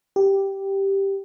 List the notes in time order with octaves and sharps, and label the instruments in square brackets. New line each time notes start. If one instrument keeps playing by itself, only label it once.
[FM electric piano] G4